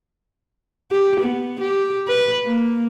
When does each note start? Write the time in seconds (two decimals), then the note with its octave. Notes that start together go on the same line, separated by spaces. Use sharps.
0.91 G4
1.20 B3
1.60 G4
2.08 B4
2.46 A#3